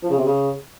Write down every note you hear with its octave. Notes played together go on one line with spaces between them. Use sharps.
F3
C#3
C3
C#3